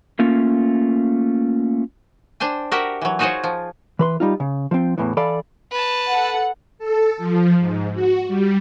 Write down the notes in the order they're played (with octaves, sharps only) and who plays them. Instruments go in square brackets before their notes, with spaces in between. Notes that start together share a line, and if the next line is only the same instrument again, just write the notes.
[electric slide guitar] A3 A#3 C#4 F4
[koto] D4 C5 G5 G#5
F#4 G4 A#4 E5 F#5
E3 F#3
D#4 F4 F#4 G#4 C5 C#5
F3
[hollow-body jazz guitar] E3 B4 C6
G3 D#4 F4
C#3
F3 C4
E2 A2 E3
E3 A4 D5 F5 B5
[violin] B4 A5
[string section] A4 F#5
[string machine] A4
F3
G#2
F#4
G3